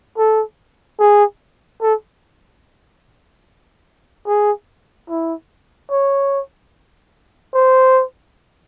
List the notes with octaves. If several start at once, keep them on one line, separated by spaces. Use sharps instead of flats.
A4
G#4
A4
G#4
E4
C#5
C5